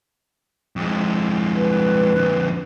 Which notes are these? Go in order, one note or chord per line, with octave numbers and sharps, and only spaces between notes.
F2 G#3
B4
F2 D3